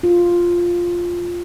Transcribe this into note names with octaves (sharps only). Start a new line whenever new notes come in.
F4